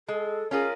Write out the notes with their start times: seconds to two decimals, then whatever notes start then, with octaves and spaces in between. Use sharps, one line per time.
0.08 G#3 A4
0.51 C#4 F4 G#4 A#4